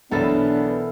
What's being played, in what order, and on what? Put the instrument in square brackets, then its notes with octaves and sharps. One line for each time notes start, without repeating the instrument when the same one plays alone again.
[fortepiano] B1 [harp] E3 A4 A#4 [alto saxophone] B3 [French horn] D4